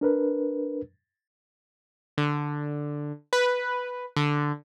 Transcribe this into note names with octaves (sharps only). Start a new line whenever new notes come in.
D4 A#4 B4
D3
B4
D3